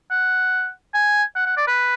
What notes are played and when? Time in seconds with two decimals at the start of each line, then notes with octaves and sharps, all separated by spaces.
0.11 F#5
0.94 G#5
1.36 F#5
1.46 F#5
1.57 D5
1.68 B4